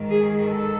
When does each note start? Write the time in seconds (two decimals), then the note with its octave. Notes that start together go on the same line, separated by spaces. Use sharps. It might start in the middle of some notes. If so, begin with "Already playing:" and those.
Already playing: G#2 D#3
0.10 G#4
0.46 A4